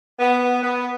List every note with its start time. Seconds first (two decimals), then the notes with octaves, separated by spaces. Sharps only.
0.19 B3
0.62 B3